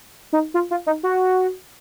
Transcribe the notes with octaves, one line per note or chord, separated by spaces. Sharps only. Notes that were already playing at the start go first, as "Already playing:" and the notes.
D#4
F4
F4
D#4
F#4